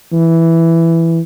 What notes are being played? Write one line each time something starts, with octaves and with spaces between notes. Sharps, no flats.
E3